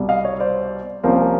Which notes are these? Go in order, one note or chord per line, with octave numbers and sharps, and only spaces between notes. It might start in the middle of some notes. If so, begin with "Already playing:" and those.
Already playing: C2 B2 G3
D#5 F5
C#5 D#5
C5 D5
C2 C3 F3 A#3 C#4 A#4 C5